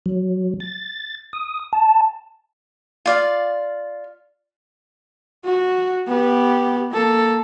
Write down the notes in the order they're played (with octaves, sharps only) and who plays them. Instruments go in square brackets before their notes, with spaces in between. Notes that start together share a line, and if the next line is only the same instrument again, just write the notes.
[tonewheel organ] F#3
A6
D#6
A5
[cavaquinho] F4 D5 F5
[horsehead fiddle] F#4
B3 G4
A#3 A4